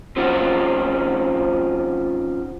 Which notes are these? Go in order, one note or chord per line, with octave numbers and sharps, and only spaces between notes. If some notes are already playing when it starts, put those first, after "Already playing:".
F3 C4 C#4 D#4 F4 F#4